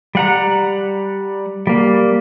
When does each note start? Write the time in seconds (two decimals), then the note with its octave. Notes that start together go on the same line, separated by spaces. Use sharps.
0.15 G3 F#5 A#5
1.67 G3 A#3